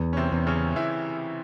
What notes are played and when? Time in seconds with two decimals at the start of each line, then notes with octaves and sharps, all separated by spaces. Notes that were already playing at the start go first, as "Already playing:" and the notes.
Already playing: E2
0.13 C#4
0.17 C3 C4
0.32 E2
0.47 C#3 C#4
0.76 E3 E4